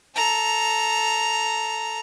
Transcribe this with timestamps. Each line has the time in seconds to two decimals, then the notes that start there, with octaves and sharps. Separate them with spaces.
0.15 A4 A#5